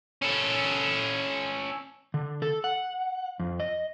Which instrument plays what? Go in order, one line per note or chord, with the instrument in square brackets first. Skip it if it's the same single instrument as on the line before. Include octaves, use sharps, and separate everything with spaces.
[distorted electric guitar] C#4 A4
[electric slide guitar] D3
A4
F#5
F2
D#5